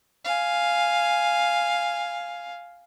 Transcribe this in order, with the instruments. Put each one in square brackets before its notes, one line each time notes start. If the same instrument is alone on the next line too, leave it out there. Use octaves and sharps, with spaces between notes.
[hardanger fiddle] F5 G#5